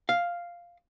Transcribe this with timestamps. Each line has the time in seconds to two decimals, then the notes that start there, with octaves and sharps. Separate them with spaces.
0.09 F5